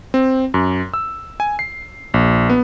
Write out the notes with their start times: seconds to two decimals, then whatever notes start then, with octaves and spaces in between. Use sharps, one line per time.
0.14 C4
0.54 F#2
0.94 E6
1.40 G#5
1.59 C7
2.14 A#1
2.50 B3